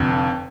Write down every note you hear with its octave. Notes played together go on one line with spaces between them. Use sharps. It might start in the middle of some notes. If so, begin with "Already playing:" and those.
Already playing: F1 F2 D3